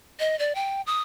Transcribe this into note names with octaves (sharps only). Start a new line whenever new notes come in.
D#5
D5
G5
D#6